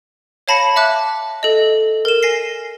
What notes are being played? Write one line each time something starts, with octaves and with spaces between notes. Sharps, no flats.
C#5 F5 A5 B5 A#6 C#7
E5 A5 D6 F#6
A4 D#5
A#4 E7
G#5 A#6 C7